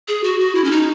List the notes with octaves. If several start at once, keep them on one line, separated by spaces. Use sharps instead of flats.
G#4
F#4
F#4
E4
C#4
D#4